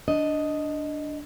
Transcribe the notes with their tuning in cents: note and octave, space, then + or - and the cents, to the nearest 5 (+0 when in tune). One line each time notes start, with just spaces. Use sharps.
D4 +0 D#5 +0